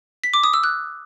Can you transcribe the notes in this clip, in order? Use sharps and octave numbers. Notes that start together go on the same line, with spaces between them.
B6
D6
D#6
E6
F#6